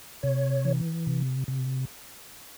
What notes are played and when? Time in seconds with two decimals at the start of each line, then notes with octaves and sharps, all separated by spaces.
0.23 C3 C#5
0.65 E3
1.07 C3
1.48 C3